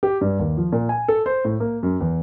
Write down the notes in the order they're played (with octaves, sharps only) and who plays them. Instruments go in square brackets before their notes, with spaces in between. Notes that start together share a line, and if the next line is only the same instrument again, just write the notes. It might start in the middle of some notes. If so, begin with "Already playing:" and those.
[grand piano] G4
G2
D#2
F3
A#2
G#5
A4
C5
A2
A#3
F#2
E2